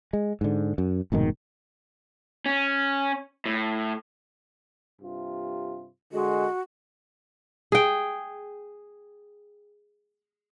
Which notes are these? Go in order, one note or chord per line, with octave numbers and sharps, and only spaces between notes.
G#3
G#2 D3
F#2
F1 G#2 B2 D#3
C#4
A2
G2 C3 F4
D3 G#3 F#4
G#4 G5